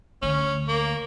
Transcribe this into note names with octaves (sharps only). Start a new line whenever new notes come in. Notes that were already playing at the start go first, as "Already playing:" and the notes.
D2 D3 C#4
A#3